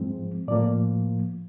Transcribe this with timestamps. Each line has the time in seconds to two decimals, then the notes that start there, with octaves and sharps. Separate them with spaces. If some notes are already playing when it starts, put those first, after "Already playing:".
Already playing: G#2 F3 G#3 C4
0.48 A2 F3 A#3 D5